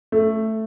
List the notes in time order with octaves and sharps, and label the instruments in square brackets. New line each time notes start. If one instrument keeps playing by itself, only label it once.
[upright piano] A3